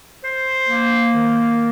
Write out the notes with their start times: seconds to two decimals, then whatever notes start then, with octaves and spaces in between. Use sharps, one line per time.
0.23 C5
0.68 A#3
1.14 D#3